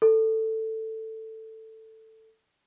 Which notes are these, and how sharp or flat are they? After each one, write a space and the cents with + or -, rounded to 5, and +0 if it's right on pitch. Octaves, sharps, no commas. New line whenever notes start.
A4 +10